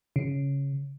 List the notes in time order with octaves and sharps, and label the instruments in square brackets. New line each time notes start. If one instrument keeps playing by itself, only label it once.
[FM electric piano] C#3